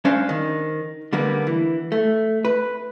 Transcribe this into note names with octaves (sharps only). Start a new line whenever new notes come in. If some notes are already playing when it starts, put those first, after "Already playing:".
G2 C#4 D4 C5 C#5 F5
D#3
D3 G3 A#3 B3
E3
A3
B4